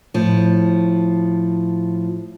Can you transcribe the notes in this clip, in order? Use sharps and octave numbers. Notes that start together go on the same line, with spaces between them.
A2 F3